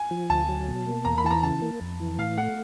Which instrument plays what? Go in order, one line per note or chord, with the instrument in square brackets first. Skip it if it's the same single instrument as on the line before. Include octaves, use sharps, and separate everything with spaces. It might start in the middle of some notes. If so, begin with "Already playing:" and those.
Already playing: [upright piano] G#5
[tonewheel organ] F3
[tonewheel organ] D2 [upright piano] A5
[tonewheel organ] F#3
B2
A#3
[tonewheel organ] E2 [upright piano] A#5
[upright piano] B5
[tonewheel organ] E3 [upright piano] A5
[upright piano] A#5
[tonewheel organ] C#3 [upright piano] A5
[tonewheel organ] A#3
F2
E3
[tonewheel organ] A2 [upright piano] F5
[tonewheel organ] A3 [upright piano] F#5